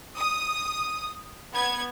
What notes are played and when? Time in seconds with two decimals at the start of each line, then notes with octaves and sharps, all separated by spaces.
0.18 D#6
1.53 B3 G#6